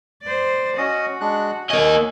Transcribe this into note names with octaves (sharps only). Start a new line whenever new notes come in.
C5 D5
C#4 F#4 D#5 D#6
G#3 D4 F#6
A#3 C#5 D#5 G#5